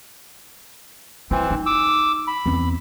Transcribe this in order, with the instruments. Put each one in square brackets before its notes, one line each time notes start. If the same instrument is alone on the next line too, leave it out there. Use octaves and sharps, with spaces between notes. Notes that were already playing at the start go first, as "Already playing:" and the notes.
[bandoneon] E3 C4 [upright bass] E4
[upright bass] D#4
[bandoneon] D6 E6
B5
[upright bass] E2 C4